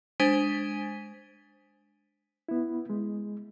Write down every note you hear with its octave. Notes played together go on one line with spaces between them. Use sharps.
G#3 D4 C5 G#5 B6 D#7
B3 E4
G#3